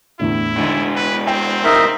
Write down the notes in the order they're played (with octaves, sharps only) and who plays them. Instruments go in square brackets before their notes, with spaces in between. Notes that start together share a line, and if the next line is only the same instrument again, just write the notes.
[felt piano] E2 A2 D3 [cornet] E4
[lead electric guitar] B2 G#3 [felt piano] D3 D#4
[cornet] B4
[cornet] C4 [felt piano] G5
[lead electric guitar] C2 G#2 [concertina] D#4 A#4 E5